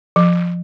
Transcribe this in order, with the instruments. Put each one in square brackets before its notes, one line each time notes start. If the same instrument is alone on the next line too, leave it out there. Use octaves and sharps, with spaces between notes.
[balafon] F3